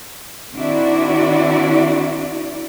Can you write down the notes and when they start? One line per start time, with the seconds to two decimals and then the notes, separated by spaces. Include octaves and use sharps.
0.54 D#3 C4 D4 E4 F#4 D5